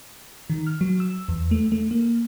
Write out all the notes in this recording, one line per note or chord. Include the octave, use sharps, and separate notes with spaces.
D#3
F6
F#3
E6
E2
A3
A3
A#3